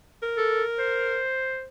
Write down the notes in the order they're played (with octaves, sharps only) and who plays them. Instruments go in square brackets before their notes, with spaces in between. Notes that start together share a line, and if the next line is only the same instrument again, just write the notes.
[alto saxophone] A#4
[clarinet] A4
C5